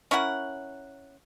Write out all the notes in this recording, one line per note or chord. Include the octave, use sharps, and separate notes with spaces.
C#4 E4 A#4 F#5